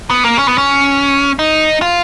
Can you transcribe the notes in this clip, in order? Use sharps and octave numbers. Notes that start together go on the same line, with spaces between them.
B3
A#3
C#4
B3
C#4
D#4
F4